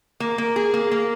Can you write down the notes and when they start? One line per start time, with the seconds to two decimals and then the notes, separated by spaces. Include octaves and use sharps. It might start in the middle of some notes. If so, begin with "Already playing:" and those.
0.20 A#3
0.38 A#3
0.56 G#4
0.74 A#3
0.91 A#3